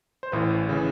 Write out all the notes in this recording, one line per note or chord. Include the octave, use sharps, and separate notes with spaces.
C5
A1 A2 E3 B4
C#3 E3